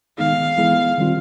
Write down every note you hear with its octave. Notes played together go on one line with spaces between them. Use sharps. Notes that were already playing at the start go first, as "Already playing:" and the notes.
D#3 G#3 B3 D#4 G#4 F5
E3 G#3 B3 E4 G#4
D#3 G3 C4 F4